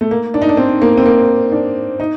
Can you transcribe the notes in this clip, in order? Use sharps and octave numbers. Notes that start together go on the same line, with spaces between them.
A3
A#3
D4
D#4
D4
C4
A#3
C4
A#3
D4
D#4